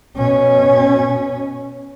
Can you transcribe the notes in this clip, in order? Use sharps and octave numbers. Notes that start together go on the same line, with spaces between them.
B2 C#4